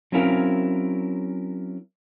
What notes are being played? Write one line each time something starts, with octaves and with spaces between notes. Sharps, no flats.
F#3 C4 C#4 E4 A#4 F5